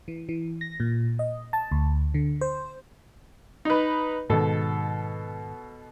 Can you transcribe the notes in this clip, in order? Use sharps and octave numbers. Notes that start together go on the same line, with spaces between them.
E3
E3
A#6
A#2
D#5
A5
D2
D3
C5
D#4 B4
G#2 B2 D#3 A4